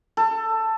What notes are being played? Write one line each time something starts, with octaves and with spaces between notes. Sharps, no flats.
A4